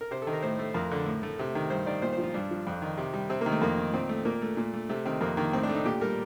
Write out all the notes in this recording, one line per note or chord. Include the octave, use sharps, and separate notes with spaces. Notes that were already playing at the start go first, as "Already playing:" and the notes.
A#4
C3 C5
A4
D#3
A#4
A2 C5
A3
F2 A#4
D3
A2
A3
C3
D#3
G2 C5
D#3 D5
A#2 C5
C5
F3
F4
G2 D4
F3
F2
D#3
C3
G3
C3 C4
A#3
D#3
A3
F2 A#3
D#3
A#2 C4
A3
A#2 A#3
A3
A#2
A3
C3 A3
D#3 C4
F2 A#3
D#3 A#3
A2 C4
D4
A3
D#4
A#2 G4
G3 A#4